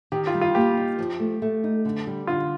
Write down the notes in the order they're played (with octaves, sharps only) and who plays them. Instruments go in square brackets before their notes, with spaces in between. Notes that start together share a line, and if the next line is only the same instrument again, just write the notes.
[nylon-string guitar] D#3 [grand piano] G4
[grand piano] F4
[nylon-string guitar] G3
[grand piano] F4
[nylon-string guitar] A#3 [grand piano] G4
[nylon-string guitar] D#4
F3
A3
A3
D#4
D3
G3
[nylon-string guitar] D3 [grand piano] F4